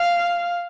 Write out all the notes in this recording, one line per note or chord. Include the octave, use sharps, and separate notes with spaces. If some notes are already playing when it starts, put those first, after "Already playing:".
Already playing: F5